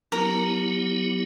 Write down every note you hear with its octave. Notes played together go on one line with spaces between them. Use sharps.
F#3 B3 E4 G4 A#4